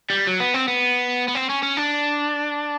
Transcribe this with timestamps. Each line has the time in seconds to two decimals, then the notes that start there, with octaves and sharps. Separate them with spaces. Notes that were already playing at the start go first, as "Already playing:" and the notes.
0.10 G3
0.27 F#3
0.40 B3
0.54 C4
0.68 B3
1.28 B3
1.35 C4
1.50 C#4
1.63 C#4
1.77 D4